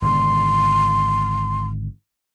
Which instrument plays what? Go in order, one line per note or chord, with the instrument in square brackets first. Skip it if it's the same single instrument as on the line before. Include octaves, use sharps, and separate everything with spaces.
[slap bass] G#1 B2 D3 [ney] C6